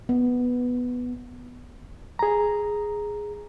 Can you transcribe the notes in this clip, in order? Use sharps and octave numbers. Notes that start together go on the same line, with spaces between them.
B3
G#4 A#5